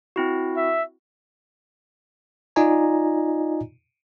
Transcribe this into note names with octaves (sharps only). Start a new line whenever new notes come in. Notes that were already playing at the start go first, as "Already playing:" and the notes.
C4 E4 F#4
E5
D#4 F4 D5 D#5 G#5 A#5